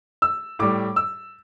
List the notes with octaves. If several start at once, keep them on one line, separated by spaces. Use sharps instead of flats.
E6
A2 G3 D6
E6